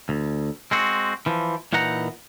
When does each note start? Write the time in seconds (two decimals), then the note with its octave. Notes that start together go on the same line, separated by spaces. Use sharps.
0.09 D2
0.71 G#3 C4 F#4
1.26 E3 F3
1.73 A#2 E3 D#4 F#5 A#5